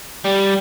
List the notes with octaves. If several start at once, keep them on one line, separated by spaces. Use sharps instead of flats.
G3